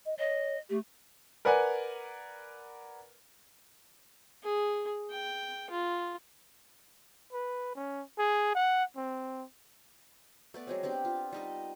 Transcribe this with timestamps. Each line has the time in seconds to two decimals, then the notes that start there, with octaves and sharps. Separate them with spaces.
0.06 D#5
0.19 C#5 D#5
0.70 A3 G4
1.45 A#4 B4 D5 F#5 G#5
4.43 G#4
5.11 G5
5.70 F4
7.33 B4
7.75 C#4
8.18 G#4
8.55 F#5
8.96 C4
10.54 A3 B3 D5
10.67 F#3 G#3 C4
10.83 B3 C4 D4 G4
11.05 F4
11.33 G3 D#4 D#5